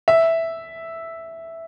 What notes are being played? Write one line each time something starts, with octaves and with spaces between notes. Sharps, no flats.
E5